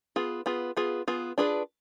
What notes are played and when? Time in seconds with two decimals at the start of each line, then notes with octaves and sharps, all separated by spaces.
0.16 B3 F4 G#4
0.46 B3 F4 G#4
0.77 B3 F4 G#4
1.08 B3 F4 G#4
1.38 D4 F4 G#4 B4